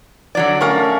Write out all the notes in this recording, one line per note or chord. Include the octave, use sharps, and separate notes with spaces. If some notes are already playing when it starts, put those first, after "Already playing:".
D3 F#3 D5
A3 C#4 A#4 F5 C#6